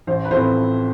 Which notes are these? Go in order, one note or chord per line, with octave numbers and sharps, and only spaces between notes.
A1 C5
B4
A2 F3 A3 C4 C5